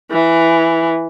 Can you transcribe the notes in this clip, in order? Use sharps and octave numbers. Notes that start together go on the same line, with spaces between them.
E3